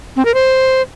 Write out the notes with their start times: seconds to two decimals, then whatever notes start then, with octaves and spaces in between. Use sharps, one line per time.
0.16 C4
0.25 A#4
0.34 C5